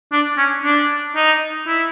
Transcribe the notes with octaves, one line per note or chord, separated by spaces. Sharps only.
D4
C#4
D4
D#4
E4